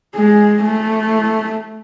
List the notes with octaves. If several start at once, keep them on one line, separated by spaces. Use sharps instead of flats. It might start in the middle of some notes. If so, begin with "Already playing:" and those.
G#3
A3